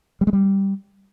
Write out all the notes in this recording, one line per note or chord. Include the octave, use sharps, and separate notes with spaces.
G3
G#3
G3